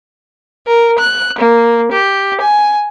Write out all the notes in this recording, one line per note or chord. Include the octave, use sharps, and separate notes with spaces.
A#4
F#6
A#3
G4
G#5